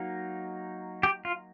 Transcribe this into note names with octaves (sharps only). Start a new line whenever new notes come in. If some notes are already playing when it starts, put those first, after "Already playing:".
Already playing: F#3 A#3 D#4
G4
F4